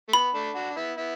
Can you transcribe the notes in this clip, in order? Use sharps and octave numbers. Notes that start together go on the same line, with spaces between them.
A3
B3 B5
A3 D4
D4 F#4
D4
B3 E4
B3 E4